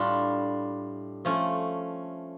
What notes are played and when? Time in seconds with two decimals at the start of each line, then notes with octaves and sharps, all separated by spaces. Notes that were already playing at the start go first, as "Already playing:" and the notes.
Already playing: A2 G3 D4 F4
1.25 F3 A3 C#4